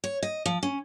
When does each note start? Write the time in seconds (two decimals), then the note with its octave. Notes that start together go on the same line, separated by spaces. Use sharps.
0.04 C#5
0.23 D#5
0.46 F3
0.63 C#4